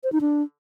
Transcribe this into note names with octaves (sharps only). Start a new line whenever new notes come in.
C5
D#4
D4